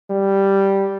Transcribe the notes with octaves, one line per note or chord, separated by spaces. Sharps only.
G3